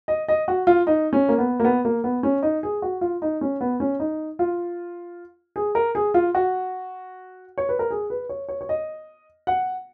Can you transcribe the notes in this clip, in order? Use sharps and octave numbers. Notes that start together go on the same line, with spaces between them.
D#5
D#5
F#4
F4
D#4
C#4
A#3
B3
A#3
B3
A#3
B3
C#4
D#4
G#4
F#4
F4
D#4
C#4
B3
C#4
D#4
F4
G#4
A#4
G#4
F4
F#4
C#5
B4
A#4
G#4
B4
C#5
C#5
C#5
D#5
F#5